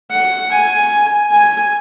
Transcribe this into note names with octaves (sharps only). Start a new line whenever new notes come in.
F#5
G#5
G#5